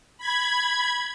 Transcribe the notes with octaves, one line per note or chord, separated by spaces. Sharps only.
B5 G#6